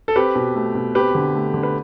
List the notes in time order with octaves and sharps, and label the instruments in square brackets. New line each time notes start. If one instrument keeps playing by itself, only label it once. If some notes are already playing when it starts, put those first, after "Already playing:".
[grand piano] A4
C4 G4 B4
B2
A3
B2
C4 G4 B4
D3
A3
D3
B4